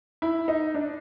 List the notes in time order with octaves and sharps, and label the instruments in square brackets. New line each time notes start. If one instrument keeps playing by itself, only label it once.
[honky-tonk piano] E4
D#4
D4